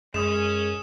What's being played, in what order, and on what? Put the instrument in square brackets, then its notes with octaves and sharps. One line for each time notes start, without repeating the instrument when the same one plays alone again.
[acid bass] F#2 [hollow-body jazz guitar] G#3 [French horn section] C#4 [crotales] D#6 E7